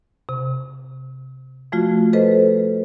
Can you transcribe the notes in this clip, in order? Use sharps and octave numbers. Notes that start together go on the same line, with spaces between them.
C3
F3 A3 F4 F#4
A4 B4 C5 D#5